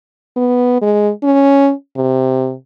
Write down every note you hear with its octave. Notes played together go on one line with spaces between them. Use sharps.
B3
G#3
C#4
C3